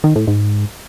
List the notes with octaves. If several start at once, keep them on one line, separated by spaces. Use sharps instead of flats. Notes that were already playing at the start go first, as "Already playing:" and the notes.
D#3
A2
G#2